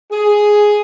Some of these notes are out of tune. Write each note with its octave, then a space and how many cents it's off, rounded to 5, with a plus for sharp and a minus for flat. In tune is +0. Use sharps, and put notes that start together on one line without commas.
G#4 +5